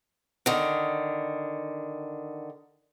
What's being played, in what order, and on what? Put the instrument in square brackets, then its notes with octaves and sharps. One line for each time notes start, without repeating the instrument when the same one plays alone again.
[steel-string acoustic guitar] D3 D#3